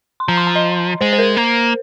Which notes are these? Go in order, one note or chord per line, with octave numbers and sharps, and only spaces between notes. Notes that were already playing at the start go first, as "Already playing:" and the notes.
C6
F3 A#5
C6
A#5
D#5
G#3 C5
C5
A#4
A#3